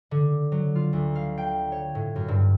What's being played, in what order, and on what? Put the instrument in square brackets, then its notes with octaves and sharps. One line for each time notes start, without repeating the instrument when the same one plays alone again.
[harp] D3
F#3
F4
D2
F5
G5
C#5
A2
F#2
G2